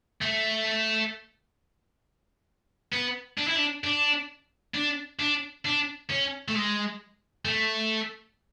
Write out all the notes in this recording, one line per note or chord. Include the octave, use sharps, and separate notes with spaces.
A3
B3
D4
E4
D4
D4
D4
D4
D4
C#4
A3
G#3
A3